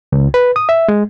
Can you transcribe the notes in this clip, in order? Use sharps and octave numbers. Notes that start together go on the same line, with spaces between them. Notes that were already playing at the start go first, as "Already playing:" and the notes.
C#2
B4
D#6
E5
G#3